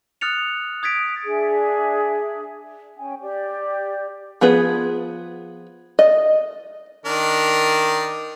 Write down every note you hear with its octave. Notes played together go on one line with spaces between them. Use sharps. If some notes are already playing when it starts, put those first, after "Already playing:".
D#6 F6 F#6 A6 C#7 F7
D#6 G#6 A6 B6 D7
D4 G#4 E5
C#4 G5 G#5
G4 D5
F3 B3 G#4 B4
D#5
D#3 D4 A#4